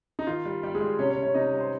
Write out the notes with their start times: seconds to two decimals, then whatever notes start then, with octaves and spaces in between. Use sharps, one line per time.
0.19 D#4
0.27 D#3 F4
0.45 G3
0.63 G3 G4
0.75 G#3 G#4
0.81 G3
0.99 C3 C#4 C#5
1.10 C#4 C#5
1.17 C3
1.23 C#4 C#5
1.34 C3 D#4 D#5
1.53 G3
1.60 C5